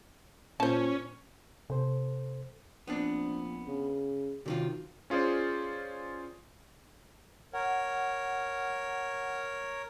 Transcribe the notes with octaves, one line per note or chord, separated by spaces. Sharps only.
A#2 C#4 C5 A5
C3 A4 C5
A#1 B3 C4 D4
C#3
C3 D#3 F#3 F4
C#4 F4 G#4 C5 D5
A#4 C#5 F#5